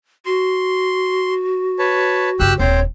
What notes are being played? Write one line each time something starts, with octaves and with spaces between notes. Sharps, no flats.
F#4 C6
B4 C#5 A5
G1 C#3 G4 E6 F#6
D#1 C4 D4 C5 C#5